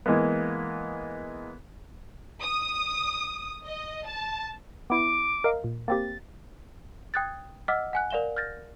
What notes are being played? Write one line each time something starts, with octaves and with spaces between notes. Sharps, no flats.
E3 G#3 A#3 B3
D#6
D#5
A5
B3 E4 D6
A#4 D#5 F5
A#2
A#3 C4 G4 A6
G5 D#6 F#6 G#6 A6
D#5 F#5 D6 E6 F6 B6
F#5 G#5 F#6
A#4 D5 F5 E7 G7
F6 G6 A6 A#6